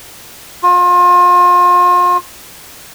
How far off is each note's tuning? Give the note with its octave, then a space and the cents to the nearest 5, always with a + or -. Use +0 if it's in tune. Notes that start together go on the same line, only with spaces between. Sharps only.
F4 +35